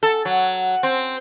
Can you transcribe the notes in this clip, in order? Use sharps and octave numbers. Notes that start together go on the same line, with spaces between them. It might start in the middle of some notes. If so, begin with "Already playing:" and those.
A4
F#3
C4